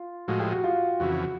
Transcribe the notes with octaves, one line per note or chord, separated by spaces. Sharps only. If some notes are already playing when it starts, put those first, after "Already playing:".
Already playing: F4
A2 F3 G#3 F#4
G4
F#4
F4
F2 C#3 E3 F#4